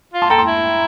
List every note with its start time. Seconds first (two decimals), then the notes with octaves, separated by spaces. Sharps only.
0.14 F4
0.22 A5 C6
0.30 A4 G5 A#5
0.38 A5 C6
0.47 E4